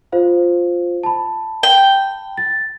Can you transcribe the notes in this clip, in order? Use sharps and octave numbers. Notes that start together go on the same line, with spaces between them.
F4 C5 F5
A5 B5
G5
A6